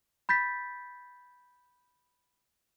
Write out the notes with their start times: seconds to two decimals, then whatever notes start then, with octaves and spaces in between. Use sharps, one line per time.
0.29 B5 G6 A6 B6